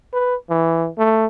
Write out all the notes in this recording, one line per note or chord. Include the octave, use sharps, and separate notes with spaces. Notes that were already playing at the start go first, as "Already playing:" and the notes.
B4
E3
A3